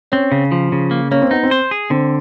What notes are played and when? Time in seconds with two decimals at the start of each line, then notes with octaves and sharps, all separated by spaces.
0.12 C4 C#4
0.32 C#3
0.52 F3
0.72 C#3
0.91 A#3
1.11 A#3 C#4
1.22 C4
1.31 B3 D#4
1.43 C4
1.51 C5
1.71 G#4
1.90 D3 C4